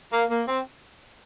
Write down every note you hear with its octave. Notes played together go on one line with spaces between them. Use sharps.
A#3
A#3
C4